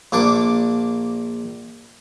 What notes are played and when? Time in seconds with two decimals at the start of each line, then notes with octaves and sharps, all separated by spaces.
0.12 A#1 A#3 D4 C#6 D6